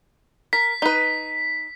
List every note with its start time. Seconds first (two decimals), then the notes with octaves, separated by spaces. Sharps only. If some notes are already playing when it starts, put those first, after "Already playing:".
0.53 A#4 B6
0.82 D#4 B4